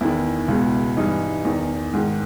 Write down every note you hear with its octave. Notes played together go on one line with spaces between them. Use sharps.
E2 D#3 E4
C#2 B2
G2 E3 D#4
E2 D#3
G#2 D#3